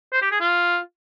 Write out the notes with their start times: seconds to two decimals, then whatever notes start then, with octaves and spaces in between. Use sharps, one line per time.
0.12 C5
0.22 G4
0.31 G#4
0.41 F4